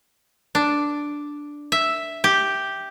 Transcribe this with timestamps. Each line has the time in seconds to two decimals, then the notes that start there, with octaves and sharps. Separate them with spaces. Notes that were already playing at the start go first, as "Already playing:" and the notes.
0.55 D4
1.72 E5
2.24 G4